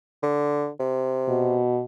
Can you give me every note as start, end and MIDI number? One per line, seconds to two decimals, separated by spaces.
0.23 0.70 50
0.80 1.59 48
1.28 1.83 47